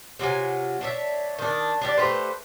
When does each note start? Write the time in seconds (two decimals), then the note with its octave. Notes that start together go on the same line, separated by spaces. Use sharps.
0.19 C3 F#3 F4 G#5
0.81 D4 C#5 E5
1.39 D#3 D4
1.81 D4 G4 A4 D5
1.97 A3 G4 B4 C5